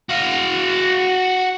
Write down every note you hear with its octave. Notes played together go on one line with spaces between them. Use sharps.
F#4 F5